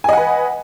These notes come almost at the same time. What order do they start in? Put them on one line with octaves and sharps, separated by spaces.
G#5 D#5 F#5 B4